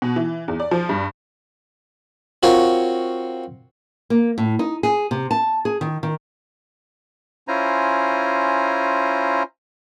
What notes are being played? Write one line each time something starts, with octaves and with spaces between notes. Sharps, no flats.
B2
E3
E2
D5
F3
G2
C4 F4 F#4 A#4 C#5
A#3
A2
D#4
G#4
C3
A5
G#4
D#3
D#3
C#4 E4 F4 C5 G#5 A#5